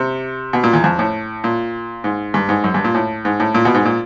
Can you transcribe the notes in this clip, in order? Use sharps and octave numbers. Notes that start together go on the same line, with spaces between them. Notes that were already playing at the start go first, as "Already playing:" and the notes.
Already playing: C3
B2
A#2
E2
F2
A2
A#2
G#2
G2
G#2
F#2
G2
A#2
A2
G#2
A2
A#2
B2
G#2
A#2